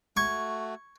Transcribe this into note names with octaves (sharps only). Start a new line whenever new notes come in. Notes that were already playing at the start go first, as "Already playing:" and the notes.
A3 F#4 C#6 G#6